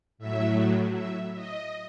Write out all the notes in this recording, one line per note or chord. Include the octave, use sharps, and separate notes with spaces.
A2 F#3 E5
E5
D#5